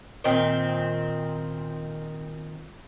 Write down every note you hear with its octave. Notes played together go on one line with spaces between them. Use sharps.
A#2 D#3 C4